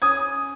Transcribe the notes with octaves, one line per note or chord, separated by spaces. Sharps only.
C#4 D#6 G#6